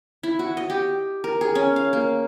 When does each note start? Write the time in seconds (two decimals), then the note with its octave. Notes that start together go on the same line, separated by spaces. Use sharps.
0.23 E4
0.39 F#4
0.57 D#5
0.70 G4
1.24 A#4
1.41 G#4
1.55 C#4
1.76 F5
1.93 A#3